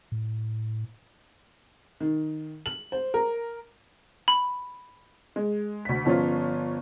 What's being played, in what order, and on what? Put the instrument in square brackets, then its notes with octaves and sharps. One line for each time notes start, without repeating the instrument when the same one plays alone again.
[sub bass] A2
[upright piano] D#3
F#7
C5
A#4
[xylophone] B5
[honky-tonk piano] G#3
D2 B6
G1 F3 C#4 F4